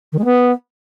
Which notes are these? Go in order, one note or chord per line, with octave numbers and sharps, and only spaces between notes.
D#3
G#3
B3